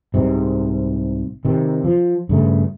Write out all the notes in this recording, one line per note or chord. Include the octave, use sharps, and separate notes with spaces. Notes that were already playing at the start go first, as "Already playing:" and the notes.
C2 G#2 C3
C3 D#3
F3
G2 C#3 A3